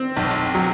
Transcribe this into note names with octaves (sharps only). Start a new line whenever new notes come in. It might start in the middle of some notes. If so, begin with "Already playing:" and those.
Already playing: C4
B1
F#3